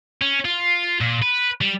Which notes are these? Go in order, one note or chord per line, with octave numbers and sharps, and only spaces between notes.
C#4
F4
A#2
B4
G3